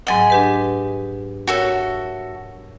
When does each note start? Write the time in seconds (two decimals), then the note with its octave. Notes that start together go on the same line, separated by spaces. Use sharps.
0.07 G#2 F#3 D#5 F#5 G#5
0.30 D4 G4 B4
1.47 F#4 A4 A#4 C#5 E5